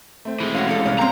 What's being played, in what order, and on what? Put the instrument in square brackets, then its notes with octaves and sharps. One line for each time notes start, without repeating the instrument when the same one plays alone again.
[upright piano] A3 C4
[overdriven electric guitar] E3 G#3
[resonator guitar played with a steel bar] C#4 E4 F#4 [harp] F5
[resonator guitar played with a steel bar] G3 E4 A4
[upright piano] C2 [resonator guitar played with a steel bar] A2 C#4
[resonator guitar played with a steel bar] A#3 C4 [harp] G5 [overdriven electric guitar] A#5